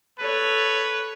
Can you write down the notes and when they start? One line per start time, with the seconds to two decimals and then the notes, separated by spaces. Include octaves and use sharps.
0.19 A4 B4 C#5